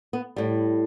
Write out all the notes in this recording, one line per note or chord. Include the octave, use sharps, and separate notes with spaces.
B3
A2 G3